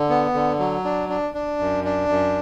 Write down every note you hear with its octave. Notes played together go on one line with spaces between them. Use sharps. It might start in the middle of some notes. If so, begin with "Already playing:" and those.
Already playing: D3
B3
D3
F#3
D4
D4
D4
F#2
D4
F#2